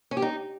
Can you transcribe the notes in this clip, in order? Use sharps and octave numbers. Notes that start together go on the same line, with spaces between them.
C#4
G4
D#4